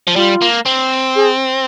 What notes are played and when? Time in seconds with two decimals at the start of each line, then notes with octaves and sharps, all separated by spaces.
0.07 F3
0.16 G3 F4
0.41 A#3
0.66 C4
1.16 G#4